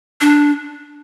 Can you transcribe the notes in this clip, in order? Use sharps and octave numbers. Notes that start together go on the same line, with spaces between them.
D4